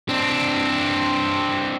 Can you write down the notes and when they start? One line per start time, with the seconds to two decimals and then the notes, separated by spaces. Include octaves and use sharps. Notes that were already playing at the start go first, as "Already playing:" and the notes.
0.09 C4 D4